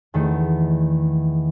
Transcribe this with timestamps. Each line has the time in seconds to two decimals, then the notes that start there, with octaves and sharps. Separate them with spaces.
0.14 E2 D#3 A3